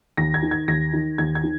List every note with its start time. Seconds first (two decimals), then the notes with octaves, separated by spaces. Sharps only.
0.17 D#2 A#6
0.34 G#6
0.43 D#3
0.51 G#6
0.68 D#2 A#6
0.93 D#3
1.18 D#2 G#6
1.35 G#6
1.44 D#3